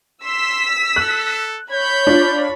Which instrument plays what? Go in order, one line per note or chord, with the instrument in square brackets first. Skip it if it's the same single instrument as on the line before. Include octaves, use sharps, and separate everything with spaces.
[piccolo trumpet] C6 [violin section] E6 B6
[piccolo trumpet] A4 [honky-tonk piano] F#6
[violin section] C#5 B5 [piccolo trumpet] G6
[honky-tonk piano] D4 F4